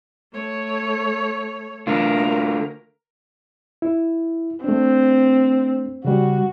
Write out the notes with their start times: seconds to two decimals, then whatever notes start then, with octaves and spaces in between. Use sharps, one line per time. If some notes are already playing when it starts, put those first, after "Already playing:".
0.33 A3 C#5
1.87 D3 A3 F4 A#4
3.82 E4
4.64 A3 C4 D4
6.05 C#3 G3 F#4